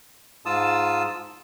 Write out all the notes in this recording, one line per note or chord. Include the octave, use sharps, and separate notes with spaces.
G#2 F4 A5 D#6 E6